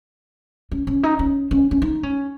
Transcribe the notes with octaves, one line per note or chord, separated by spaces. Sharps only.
C#4
C#4
D#4
C#4
C#4
C#4
D#4
C#4